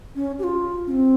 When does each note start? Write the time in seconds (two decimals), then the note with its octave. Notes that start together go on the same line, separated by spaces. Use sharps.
0.16 C#4
0.39 G4
0.44 F4
0.87 C#4
0.91 C4